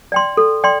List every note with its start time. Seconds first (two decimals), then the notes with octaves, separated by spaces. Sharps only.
0.12 D5 G5 C6
0.37 A4
0.64 D5 G5 C6